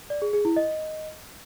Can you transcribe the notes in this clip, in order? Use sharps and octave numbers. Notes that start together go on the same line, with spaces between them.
D5
G#4
G#4
E4
D#5